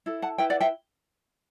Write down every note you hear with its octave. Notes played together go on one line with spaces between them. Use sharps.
E4 A4
F#5 A5
E4 B4 E5 G5
D5 F#5
E5 G5